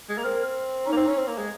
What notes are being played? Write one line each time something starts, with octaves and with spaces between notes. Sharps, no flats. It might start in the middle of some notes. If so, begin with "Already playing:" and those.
G#3
A#3
C4 A#4
C#4 D#4
A#3
C4
C#4
C4
A#3
G#3